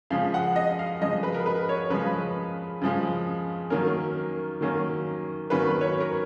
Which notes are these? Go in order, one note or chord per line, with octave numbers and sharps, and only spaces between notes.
C#3 F3 G#3 F5
F#5
D#5
F5
C#3 F3 G#3 D#5
B4
A#4
B4
C#5
C#3 F3 G#3 B4
C#3 F3 G#3
D#3 F#3 A#3 C#4 A#4
A#4
D#3 F#3 A#3 C#4
D#3 F#3 A#3 C#4 B4
B4
C#5
A#4